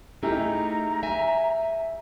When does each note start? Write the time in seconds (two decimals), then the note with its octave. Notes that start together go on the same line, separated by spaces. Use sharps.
0.23 A3 D#4 E4 G4 G#4 A#5
1.03 E5 G#5